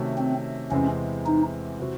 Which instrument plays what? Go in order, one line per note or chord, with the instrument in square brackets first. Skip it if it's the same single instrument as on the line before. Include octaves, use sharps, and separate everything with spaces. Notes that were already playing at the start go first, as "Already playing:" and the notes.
Already playing: [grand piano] C3 D#3 A3 C#4 F#4
[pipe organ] C4
[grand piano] E2 C3 E3 G#3 C4 [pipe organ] C#4
[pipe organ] D#4
[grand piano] C3 E3 C4 F#4